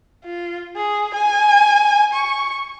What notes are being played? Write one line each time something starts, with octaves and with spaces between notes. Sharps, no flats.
F4
G#4
G#5
C#6